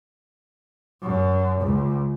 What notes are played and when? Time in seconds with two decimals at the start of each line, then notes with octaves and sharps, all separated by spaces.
1.03 F#2
1.61 C#2